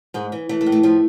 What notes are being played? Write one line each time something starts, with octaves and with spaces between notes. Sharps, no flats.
G#2 G#3
E3
E3 A3
A3
A2
A3
F3 A3